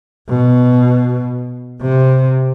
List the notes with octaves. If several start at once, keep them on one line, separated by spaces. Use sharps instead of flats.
B2
C3